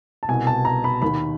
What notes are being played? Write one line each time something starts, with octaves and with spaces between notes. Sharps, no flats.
A5
C2 B2 G#5
A5
A#5
B5
D#2 D#3 B5